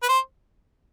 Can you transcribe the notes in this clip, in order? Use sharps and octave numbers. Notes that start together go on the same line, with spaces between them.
B4
C5